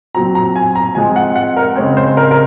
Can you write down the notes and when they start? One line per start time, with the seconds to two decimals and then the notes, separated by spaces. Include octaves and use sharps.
0.15 A#2 F#3 C4 A#5
0.35 A#5
0.56 G#5
0.76 A#5
0.95 F3 G#3 C4 G#5
1.16 F#5
1.36 F#5
1.57 A#4
1.76 C#3 G#3 C4 C#5
1.97 C5
2.17 A#4
2.31 A#4